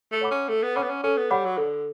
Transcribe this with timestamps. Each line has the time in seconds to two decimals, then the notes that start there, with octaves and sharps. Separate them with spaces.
0.12 A3
0.21 C#5 F#5 B5 D6
0.31 C#4
0.49 A3 A4
0.63 B3
0.76 C#4 C#5 F#5 B5 D6
0.83 B3
0.89 C#4
1.04 C#4 A4
1.17 B3
1.31 G3 C#5 F#5 B5 D6
1.45 F#3
1.58 D3 A4